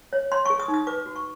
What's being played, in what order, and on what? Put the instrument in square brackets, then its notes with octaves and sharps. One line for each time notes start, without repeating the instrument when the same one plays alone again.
[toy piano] C#5
C#5 C6
C#6
G#4
D#6
D#4
D#6
B4 D6
F#4
C#6